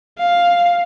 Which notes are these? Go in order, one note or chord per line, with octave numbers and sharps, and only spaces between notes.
F5